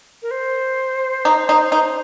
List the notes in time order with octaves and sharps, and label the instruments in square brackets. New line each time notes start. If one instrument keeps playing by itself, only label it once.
[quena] A#4
C5
[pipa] D#4
D#4
D#4